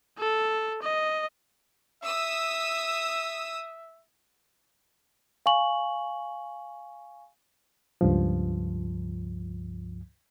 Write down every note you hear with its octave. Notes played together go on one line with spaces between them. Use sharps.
A4
D#5
E5 D#6 E6
F5 G#5 C#6 F#7
C#2 G2 F3